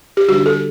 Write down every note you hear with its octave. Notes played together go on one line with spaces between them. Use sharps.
G4
D3 G3 D4 F#4
A4